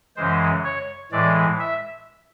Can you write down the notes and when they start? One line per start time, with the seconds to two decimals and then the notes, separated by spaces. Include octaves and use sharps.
0.17 F#2 C#3 E3 G#3 C5
0.64 C#5
1.12 A2 E3 G#3 D5
1.60 E5